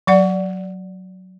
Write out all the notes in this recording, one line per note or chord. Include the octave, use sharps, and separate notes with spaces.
F#3 D5 F#5